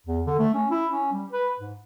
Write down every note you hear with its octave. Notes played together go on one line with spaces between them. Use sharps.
E2
D3
A3
C#4
E4
C#4
G3
B4
G#2